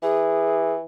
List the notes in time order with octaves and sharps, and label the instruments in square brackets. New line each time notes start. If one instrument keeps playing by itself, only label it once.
[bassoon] E3 [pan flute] G#4